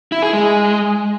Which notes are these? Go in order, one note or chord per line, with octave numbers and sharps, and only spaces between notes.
E4
G#4
G#3